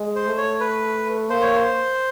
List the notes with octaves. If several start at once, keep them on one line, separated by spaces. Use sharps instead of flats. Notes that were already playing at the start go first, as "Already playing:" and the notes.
Already playing: G#3
C5
A3
C#5
B4
A#3 C5
C#5
C5